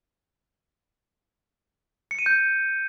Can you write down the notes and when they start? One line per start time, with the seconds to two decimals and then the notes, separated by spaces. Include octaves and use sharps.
2.11 C#7
2.19 D#7
2.26 G6